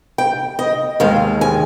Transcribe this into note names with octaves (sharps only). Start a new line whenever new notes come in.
G5
D#5
D#2 D#3 G#3 F5
G#5